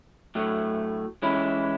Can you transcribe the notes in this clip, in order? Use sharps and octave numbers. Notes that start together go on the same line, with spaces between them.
A2 F#3 A3
E3 G#3 C#4 E4